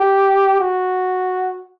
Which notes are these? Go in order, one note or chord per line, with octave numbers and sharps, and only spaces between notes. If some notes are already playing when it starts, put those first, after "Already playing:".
Already playing: G4
F#4